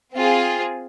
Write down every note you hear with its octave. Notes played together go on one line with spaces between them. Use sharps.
C4 F4 G#4